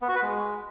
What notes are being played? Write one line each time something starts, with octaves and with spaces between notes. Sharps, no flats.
B3
F#4
B4
G#3